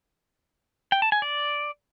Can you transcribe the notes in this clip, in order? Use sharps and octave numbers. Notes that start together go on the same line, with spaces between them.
G5
A5
G#5
D5